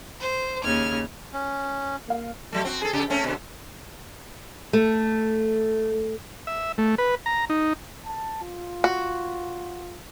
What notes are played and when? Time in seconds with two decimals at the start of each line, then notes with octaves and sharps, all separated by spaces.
0.22 C5
0.64 D#2 C#3 F6 G#6
1.33 C#4
2.08 A#3 F5
2.52 F#3 A3
2.65 C4 F#4
2.82 G#4 A4
2.93 C#3 G4
3.10 A3 C4 C#4
3.24 B2 D3
4.73 A3
6.47 E5
6.78 A3
6.98 B4
7.26 A#5
7.50 D#4
8.06 A5
8.41 F4
8.84 F#4